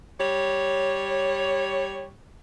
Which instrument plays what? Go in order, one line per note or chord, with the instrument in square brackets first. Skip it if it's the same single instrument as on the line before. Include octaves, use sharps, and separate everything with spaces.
[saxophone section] G3 C#5